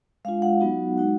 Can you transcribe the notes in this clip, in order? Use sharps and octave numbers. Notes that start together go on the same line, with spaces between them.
G#3 D4 F4 F5
F#5
F#3 B3 D#4 F#4
G#3 D#4 F#4